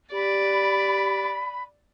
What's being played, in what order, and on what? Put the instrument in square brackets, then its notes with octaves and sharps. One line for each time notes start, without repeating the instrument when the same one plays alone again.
[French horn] G4 [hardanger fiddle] D5 [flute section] B5